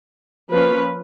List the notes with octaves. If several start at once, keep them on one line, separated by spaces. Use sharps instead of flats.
F3 A#3 C#4 B4